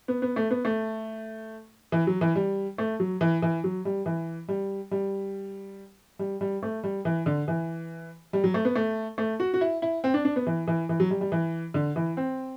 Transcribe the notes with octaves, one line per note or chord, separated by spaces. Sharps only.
B3
B3
A3
B3
A3
E3
F#3
E3
G3
A3
F#3
E3
E3
F#3
G3
E3
G3
G3
G3
G3
A3
G3
E3
D3
E3
G3
F#3
A3
B3
A3
A3
F#4
F#4
E4
E4
C4
D4
D4
B3
E3
E3
E3
F#3
G3
G3
E3
D3
E3
C4